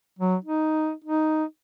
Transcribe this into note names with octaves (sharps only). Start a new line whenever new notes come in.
F#3
D#4
D#4